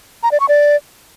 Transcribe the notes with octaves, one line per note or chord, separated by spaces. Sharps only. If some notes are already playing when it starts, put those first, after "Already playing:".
A#5
D5
C#6
D5